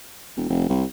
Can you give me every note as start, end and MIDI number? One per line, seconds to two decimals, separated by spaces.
0.37 0.46 28
0.49 0.68 29
0.69 0.84 36